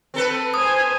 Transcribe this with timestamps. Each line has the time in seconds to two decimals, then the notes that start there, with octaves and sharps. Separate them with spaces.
0.14 C4 A4 B4
0.54 C5 G#5 D#6